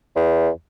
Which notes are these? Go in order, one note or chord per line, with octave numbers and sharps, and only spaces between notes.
E2